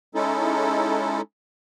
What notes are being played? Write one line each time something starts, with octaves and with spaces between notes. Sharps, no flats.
G#3 C#4 D#4 E4 A4